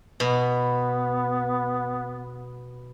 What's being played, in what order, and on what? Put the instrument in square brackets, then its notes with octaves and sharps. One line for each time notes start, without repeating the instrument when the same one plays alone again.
[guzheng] B2 [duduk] B3